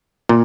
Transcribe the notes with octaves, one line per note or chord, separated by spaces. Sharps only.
A#2